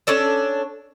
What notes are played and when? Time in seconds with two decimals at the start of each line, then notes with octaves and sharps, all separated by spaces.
0.07 C#4 D4 A4 D5